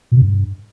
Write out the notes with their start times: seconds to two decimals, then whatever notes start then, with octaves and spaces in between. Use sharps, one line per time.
0.12 A#2
0.17 C3
0.22 G2